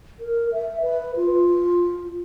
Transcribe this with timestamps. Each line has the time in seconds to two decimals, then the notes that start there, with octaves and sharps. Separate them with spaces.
0.20 A#4
0.52 E5
0.81 B4
1.16 F4